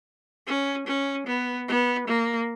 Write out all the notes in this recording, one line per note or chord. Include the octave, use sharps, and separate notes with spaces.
C#4
C#4
B3
B3
A#3